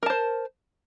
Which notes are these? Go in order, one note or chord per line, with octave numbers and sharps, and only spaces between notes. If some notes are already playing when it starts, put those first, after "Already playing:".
A#4 C5 A5